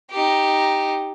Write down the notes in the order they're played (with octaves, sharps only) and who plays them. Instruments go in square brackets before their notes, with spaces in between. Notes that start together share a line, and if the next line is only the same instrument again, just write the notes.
[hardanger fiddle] D#4 G4